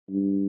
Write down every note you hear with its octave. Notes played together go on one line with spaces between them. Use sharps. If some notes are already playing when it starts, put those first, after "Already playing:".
G2